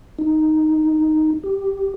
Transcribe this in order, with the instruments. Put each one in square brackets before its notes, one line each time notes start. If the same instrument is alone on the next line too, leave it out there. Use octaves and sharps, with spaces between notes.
[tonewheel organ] D#4
G4